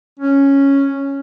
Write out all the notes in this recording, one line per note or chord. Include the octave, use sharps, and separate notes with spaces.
C#4